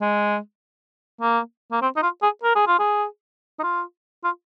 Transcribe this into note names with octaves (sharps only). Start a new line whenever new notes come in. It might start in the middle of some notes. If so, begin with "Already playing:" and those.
G#3
A#3
A#3
C4
D#4
F4
G#4
A#4
G#4
F4
G#4
D#4
F4
F4